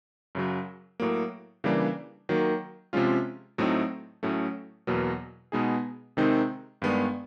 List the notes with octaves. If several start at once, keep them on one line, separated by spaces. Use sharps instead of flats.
F#2 C#3 F#3
A2 F#3 A#3
C#3 E3 G3 A#3 D4
D#3 F#3 A#3
C3 F3 G#3 C#4 F4
A2 F#3 A3 C4 D#4
A2 F#3 A3 C#4
E2 B2 F#3 A#3
B2 G#3 B3 D#4 G#4
C3 D#3 G#3 C4 D#4
G2 D#3 G#3 B3 D4